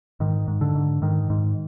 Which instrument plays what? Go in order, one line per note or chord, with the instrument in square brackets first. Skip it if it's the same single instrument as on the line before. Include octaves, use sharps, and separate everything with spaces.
[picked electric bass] G#2 D#3
G#2
D3
G#2
G#2 D#3
G#2